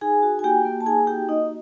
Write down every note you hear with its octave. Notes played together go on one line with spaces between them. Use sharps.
D#4 G#4 G#5
F#4
G#5
A#3 G4 G5
A#3
A5
D#4 G#4 G#5
F#4 G4 G5
A#3 D#4 D#5